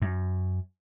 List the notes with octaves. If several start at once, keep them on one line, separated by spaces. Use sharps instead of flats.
F#2